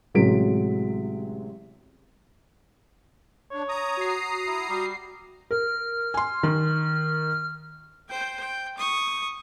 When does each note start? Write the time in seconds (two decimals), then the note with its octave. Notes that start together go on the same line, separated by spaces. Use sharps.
0.14 A1 C3 F#3 G#3 B6 D7
3.51 D4 C#5
3.69 A#5 D#6
3.97 F#4 C7
4.47 E4
4.69 G3
5.51 A#4 F6
6.14 G#5 C6
6.43 D#3
8.09 C5 G5
8.40 G5
8.78 C#6 D#6